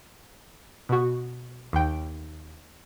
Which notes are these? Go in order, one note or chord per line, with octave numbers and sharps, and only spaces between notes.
B2 F#4
D#2 G5